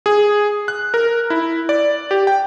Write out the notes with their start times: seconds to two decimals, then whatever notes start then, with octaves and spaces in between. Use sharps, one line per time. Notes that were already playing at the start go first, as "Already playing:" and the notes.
0.06 G#4
0.68 F#6
0.94 A#4
1.30 E4
1.69 D5
2.11 G4
2.27 G5